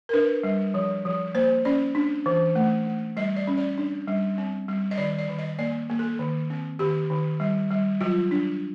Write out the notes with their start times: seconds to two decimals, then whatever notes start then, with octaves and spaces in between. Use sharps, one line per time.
0.09 A#4
0.13 D4 B4
0.43 G3
0.74 F3
1.05 F3
1.35 A#3 C5
1.65 C#4 D5
1.95 D4
2.26 E3
2.55 A3
2.86 A3
3.17 G3 D#5
3.36 D5
3.47 C#4
3.57 D5
3.78 D4
4.08 G3
4.38 C4
4.68 G3
4.91 D#5
4.98 D#3 D5
5.18 D5
5.29 D#3
5.39 D#5
5.59 A#3 D5
5.90 A#3
5.99 A4
6.19 D#3
6.50 C4
6.79 D#3 G4
7.10 D#3
7.40 G3
7.70 G3
8.01 F#3 F4
8.31 D4